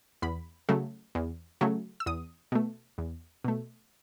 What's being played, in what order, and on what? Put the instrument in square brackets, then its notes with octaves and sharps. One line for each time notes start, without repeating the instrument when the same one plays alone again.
[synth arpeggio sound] E2 B5
C#3 F#3 A3
E2
C#3 F#3 A3
E6
E2 D#6
B2 A3
E2
B2 A3